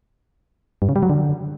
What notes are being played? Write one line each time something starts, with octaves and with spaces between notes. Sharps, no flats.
G2
C#3
G3
F#3
D3